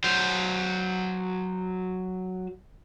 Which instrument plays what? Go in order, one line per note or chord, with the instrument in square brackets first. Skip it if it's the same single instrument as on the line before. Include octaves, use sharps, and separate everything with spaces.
[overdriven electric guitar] F#3 C5